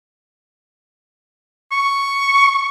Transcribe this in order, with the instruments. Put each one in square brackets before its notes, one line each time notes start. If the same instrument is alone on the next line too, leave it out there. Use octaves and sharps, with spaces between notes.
[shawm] C#6